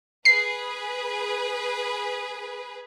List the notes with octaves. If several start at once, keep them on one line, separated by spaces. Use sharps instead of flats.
G#4 B4 C7